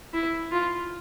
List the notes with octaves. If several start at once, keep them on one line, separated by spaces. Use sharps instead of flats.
E4
F4